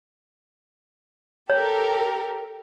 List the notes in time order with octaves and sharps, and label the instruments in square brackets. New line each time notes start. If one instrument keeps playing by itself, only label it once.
[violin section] G4 A4 A#4 [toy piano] C#5